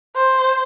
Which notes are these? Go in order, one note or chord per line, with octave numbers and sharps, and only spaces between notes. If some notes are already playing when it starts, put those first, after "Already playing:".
C5